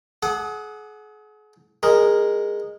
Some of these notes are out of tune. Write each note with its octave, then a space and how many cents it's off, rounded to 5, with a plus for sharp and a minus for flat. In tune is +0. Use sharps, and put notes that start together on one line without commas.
G#4 +40 F#5 +0 D#6 -30
G#3 -15 A#4 +0